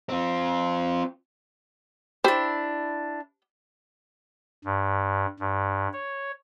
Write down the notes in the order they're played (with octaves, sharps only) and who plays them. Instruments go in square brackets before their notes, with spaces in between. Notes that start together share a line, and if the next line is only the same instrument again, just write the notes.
[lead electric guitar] C4 F4
[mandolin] D4 E4 [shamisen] G4 C5
[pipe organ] G2
G2
C#5